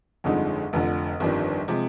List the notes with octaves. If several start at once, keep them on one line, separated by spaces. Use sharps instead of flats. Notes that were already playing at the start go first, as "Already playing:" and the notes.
G1 F2 D3 G#3 D#4
F1 F2 D3
G1 F2 D#3 G3 D4
C3 F3 G#3